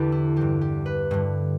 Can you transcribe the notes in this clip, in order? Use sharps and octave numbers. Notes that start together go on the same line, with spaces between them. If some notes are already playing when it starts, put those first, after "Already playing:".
Already playing: E2 D3 G4 A4 B4
E4
G2 E3 G4
G4
B4
G2 D3